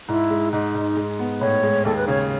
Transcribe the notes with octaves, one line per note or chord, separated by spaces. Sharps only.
G#2 E4
G#3
G#2 D#4
G#2
G#3
B3
A2 C#5
G#3
D#2 A4
B4
C#3 C#5